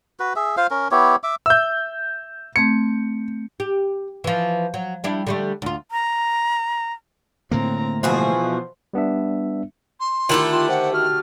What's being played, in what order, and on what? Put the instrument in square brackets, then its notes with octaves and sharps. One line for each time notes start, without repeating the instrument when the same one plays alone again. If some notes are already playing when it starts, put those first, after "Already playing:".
[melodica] F#4 B4
G#4 E5
F4 C5 F5
C#4 A#4
B3 E4 G4 C#5
E5 D6
[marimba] E5 [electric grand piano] E6 G6
[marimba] A3 C4 G#6 [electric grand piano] C#7
[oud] G4
E3 F3
F#3
G3 D4 E4
D3 G3 A3
D2 F4
[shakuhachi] A#5
[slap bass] A2 D3 A#3 [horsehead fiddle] C4 A#5
[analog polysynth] B2 E3 F3 [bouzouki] F4 F#4 G#4 [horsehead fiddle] C5
[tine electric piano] G3 B3 D4 E5
[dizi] C6
[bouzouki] D3 A3 G4 [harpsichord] D#3 E4 A5 [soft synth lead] F4
[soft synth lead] F4 [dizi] C6
[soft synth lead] C5 [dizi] F#5
[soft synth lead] F#4 [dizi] F6